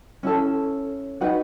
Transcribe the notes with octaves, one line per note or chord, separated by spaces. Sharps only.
C#4 E4 A4
D#4 F#4 B4 F#5